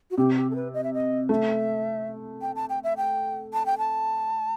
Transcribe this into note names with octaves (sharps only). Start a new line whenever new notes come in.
F#4
C3 G4
G4
A4
B4
D#5
E5
D#5
A3 E5
G5
A5
G5
E5
G5
A5
G5
A5